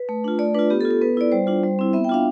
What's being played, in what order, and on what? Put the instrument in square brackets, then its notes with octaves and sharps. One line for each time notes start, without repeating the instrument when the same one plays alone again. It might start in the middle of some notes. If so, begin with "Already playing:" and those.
Already playing: [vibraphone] B4
A3
D4 F4
A3 D5
D4 F4 B4
B3 G4
A4
F4
A4
B3 B4
E4 D5
G3 C5
D4 F4
G3
C4 E4
B3 E5
G5
D4 F4 F5